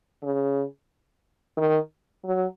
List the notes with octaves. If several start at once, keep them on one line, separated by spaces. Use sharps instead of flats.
C#3
D#3
F#3